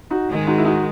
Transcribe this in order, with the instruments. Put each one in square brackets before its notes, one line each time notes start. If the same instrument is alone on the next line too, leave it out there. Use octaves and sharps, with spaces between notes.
[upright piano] D#4 F#4
[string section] G#2 D#3 G#3
[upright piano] D#4 F#4
E4
D#4 F#4